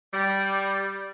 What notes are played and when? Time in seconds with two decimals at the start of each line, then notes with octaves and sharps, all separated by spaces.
0.13 G3